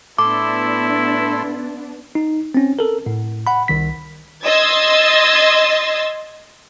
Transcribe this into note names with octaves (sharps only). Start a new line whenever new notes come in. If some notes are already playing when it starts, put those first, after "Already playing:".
A2 B3 D4 E4 A4 C6 D6
D#4
C4 C#4
A4 A#4
A2
F#5 B5
C2 D#3 B6
D#5 C6 E6 G#6 A6